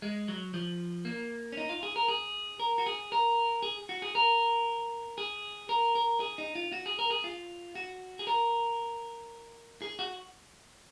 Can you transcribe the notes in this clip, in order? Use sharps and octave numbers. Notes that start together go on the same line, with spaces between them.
G#3
F#3
F3
A#3
C#4
D#4
F4
G#4
A#4
G#4
A#4
F#4
G#4
A#4
G#4
F#4
G#4
A#4
G#4
A#4
A#4
G#4
D#4
F4
F#4
G#4
A#4
G#4
F4
F#4
G#4
A#4
G#4
F#4